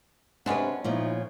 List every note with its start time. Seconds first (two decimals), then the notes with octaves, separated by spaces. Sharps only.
0.46 C3 F#3 G#3 C#4 D4 B4 F#5
0.84 A#2 F3 B3 D#4 E4 C#5